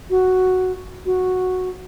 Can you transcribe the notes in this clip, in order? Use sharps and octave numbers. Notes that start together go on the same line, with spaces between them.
F#4
F#4